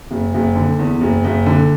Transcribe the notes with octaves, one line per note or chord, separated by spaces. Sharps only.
F#1
F#1
D3
E2
F#1
F#1
D3